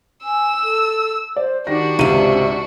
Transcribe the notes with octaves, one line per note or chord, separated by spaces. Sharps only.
G#5 E6
A4
C5 D5
D#3 D4 F#4 G4 A#6
C#2 G#2 C3 E5 D#7